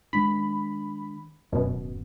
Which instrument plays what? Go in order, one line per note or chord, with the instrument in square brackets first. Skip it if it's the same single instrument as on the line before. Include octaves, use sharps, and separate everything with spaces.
[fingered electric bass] D#3 G#3 D4 [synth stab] B5
[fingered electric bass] D1 D#3 B3 [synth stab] F#2 B2